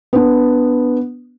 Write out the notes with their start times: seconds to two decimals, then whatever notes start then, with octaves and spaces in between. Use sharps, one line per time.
0.13 B3 D4